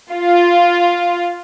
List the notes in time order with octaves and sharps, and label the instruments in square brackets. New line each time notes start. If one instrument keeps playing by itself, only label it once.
[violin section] F4